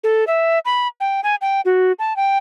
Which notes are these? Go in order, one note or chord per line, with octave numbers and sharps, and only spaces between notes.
A4
E5
B5
G5
G#5
G5
F#4
A5
G5